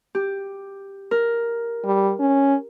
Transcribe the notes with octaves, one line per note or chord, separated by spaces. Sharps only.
G4
A#4
G3
C#4